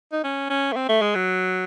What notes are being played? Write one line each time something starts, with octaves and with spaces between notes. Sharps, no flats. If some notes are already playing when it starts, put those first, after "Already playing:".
D#4
C#4
C#4
A3
C4
A3
G#3
F#3